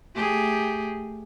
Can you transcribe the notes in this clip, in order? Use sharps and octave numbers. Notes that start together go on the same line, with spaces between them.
A3 G4 G#4